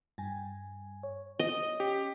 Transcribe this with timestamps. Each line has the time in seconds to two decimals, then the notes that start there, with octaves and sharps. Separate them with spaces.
0.18 G2 G#5
1.03 C#5
1.39 D#5
1.80 C#4 G4